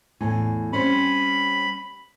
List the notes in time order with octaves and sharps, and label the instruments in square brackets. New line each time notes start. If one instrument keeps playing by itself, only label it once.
[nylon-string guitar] E2 A2 G#5
[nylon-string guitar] G3 C4 C#4 [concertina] B5